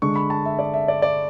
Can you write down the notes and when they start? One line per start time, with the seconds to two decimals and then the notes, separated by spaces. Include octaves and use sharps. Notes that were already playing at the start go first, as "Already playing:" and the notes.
0.02 D3 G#3 D4 C#6
0.16 B5
0.30 A5
0.45 E5
0.59 D5
0.74 E5
0.88 D5
1.02 D5